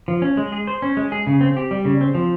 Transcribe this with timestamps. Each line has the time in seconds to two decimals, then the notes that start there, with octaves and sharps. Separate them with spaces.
0.08 F3
0.22 C#4
0.37 G#3
0.52 G#4
0.67 C5
0.82 C#4
0.97 G#3
1.12 G#4
1.27 C#3
1.41 C4
1.57 G4
1.71 G3
1.85 C#3
2.01 C4
2.15 F3